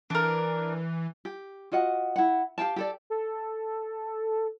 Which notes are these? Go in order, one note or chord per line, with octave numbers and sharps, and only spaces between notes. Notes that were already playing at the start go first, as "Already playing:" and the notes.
E3 D4 A#4
G4
F4 F#4 D#5 F#5
E4 F#5
G4 F5 G5 A5
G4 A4 D5
A4